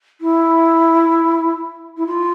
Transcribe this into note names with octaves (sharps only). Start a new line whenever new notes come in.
E4
E4
F4